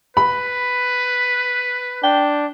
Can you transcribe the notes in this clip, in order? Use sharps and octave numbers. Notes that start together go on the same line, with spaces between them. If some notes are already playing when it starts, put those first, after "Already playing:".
B4 B5
D4 G5